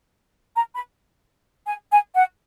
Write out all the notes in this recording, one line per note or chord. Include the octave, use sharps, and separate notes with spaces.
A#5
B5
G#5
G#5
F#5